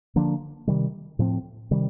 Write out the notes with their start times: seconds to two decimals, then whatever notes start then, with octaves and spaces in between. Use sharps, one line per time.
0.16 D3 F3 A#3 D4
0.67 C3 D#3 G3
1.19 A2 F3 C4
1.71 C3 D#3 G3